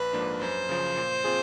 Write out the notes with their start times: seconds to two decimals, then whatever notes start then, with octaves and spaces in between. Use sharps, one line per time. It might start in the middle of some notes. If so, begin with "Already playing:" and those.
Already playing: A#1 B4
0.13 G#2 F3 A#3 D4
0.41 F#2 C5
0.69 C#3 F3
0.97 A#2
1.24 C4 F4 G#4